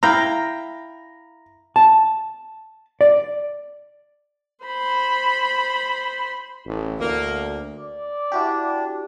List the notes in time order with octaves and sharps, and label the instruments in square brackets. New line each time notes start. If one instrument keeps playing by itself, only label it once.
[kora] E4 F5 G5 [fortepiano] A#5
[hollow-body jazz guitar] A5
D5
[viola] C5 B5
[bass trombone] A1
[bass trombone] D2 [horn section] A#3
[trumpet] D5
[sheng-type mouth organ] D4 [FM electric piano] E4 F#4 G4